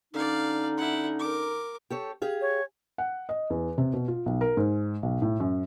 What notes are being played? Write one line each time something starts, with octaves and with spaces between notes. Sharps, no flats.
D3 C#4 D#4 D5 F5
E4 F#5
A#4 D6
G4 A4 C#5
G4 G#4 F5
C#5
F#5
D#5
E2
C3
B2
F4
B1
A#4
G#2
B1
A2
F#2